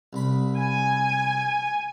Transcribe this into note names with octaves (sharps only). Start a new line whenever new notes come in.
C2 B5
G#5